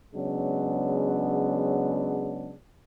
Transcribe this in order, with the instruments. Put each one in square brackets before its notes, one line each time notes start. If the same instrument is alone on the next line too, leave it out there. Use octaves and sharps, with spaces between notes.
[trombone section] C#3 F#3 G#3 B3 D4